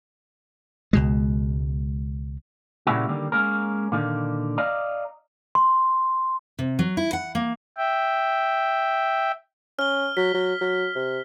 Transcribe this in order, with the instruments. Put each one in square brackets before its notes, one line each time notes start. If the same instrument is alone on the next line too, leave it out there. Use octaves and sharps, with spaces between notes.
[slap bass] C#2 B2 G#3
[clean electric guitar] A#2 C#3 G3 A#3 E4 F#4
D3 D#3 G3 A#3
G#3 A#3 C#4 A#4
A#2 D3 D#3 A#3
D5 D#5 F5 A#5
[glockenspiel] C6
[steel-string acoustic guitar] C3
F#3
E4
F#5
A#3
[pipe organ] E5 G5
[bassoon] C#4 [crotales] F6 G7
[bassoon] F#3 [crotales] B6
[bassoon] F#3
F#3
C3